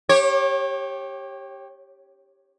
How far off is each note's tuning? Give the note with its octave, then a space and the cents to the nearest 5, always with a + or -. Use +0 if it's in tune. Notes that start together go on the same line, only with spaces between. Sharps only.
G4 +0 C#5 -30